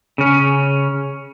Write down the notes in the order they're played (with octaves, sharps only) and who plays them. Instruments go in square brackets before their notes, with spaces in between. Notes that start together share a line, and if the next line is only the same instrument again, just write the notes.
[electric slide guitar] C#3 C#4